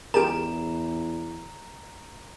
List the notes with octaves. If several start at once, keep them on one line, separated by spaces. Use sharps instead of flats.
E2 F4 G4 G#4 A#4 A#5 D7